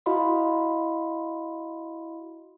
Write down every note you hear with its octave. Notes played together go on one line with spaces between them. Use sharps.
E4 F#4 D#5 F5 B5 C6